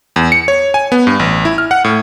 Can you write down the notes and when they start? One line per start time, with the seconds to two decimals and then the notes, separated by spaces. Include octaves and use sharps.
0.16 E2
0.32 C#7
0.48 C#5
0.74 G#5
0.92 B3
1.07 G2
1.19 A1
1.45 E4
1.58 F6
1.71 F#5
1.84 A2